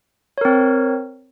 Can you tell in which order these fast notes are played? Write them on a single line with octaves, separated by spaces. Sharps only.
C#5 A#4 C4